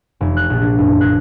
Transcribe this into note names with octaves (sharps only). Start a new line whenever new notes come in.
F1
F#6
A#1
D4
F#1
F#6